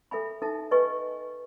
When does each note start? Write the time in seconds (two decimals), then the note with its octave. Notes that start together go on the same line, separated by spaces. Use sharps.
0.11 A4 E5 G#5 B5
0.42 D#4 A4 E5 A5
0.71 B4 D#5 G#5 C#6